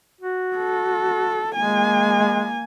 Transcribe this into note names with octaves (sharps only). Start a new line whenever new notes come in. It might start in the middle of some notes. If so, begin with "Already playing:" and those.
F#4
A4
G#3 A#3 G#5